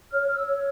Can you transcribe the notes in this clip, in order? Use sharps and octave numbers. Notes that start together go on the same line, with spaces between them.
C#5 F6
C#5 F6
E6
C#5